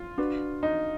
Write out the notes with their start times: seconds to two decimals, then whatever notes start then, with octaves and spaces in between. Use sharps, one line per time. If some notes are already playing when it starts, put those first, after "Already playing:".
Already playing: F4
0.18 D4 F#4 B4
0.63 D#4